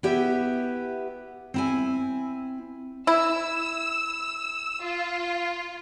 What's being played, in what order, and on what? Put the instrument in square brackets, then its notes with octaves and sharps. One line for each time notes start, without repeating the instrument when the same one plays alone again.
[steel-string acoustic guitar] B3 E4 G4 E5
C4 E4 G#5
[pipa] E4 [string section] E6
[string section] F4